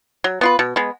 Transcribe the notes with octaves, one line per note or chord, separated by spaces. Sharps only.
F#3
B3 F4 B4
B2
G#3 B3